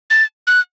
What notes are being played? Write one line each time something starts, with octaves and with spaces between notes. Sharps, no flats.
A6
F#6